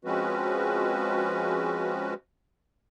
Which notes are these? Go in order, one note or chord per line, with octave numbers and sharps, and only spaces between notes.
F3 G#3 C4 C#4 F#4 B4